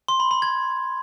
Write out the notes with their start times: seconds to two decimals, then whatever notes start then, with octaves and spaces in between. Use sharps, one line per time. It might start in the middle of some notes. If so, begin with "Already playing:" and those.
0.08 C6
0.20 B5
0.31 B5
0.42 G#6